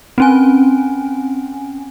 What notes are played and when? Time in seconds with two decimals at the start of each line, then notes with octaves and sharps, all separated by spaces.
0.18 C4 C#4 G#5